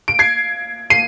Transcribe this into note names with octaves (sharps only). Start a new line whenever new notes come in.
D7
G#6 C7
C7 D#7